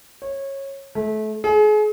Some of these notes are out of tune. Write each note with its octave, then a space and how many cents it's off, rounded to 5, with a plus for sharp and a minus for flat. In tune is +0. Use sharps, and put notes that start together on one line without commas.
C#5 -20
A3 -30
G#4 +35